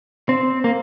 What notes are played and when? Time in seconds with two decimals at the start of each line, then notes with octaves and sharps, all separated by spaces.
0.29 C4
0.64 A#3